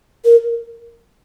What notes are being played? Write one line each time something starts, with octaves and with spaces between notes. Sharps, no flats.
A#4